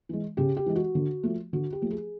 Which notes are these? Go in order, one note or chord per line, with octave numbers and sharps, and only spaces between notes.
E3 G#3
C#3 G4
G4
E3 G#3
F#4
D3
F3 A3
D3 F#4
G4
F3 A3
G#4